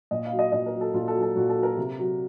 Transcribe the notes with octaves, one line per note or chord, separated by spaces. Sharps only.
A#2 D#5
F5
F#3
D#5
A#2 D#5
A#4
F#3
A4
A#2 F4
A4
F#3
A4
A#2 F#4
A4
F#3
A#4
C3
F#3